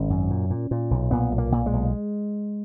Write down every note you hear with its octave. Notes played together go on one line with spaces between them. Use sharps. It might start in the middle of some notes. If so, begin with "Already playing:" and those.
Already playing: G#1 C#4
F#2
A#2
A#2
A#2
B1
A#2 B3
B1
A#3
A#2
G#3
B1